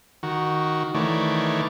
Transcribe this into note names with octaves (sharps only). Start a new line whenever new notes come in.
D#3 F#4
D#3 E3 A3 C#5 D5